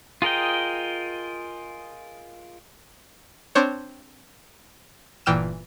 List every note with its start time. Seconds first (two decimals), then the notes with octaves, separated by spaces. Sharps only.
0.22 F4 G#4 A#4 D#5 G5
3.55 C4 D4 C5 C#5
5.26 G1 A#2 E3 G5 F6 E7